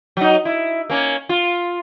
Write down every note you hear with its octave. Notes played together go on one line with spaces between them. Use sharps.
F#3 D#4
E4
A#3 C#4
F4